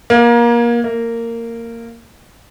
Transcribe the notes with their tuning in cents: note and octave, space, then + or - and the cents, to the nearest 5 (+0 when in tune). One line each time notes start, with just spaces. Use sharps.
A#3 +25
A#3 -15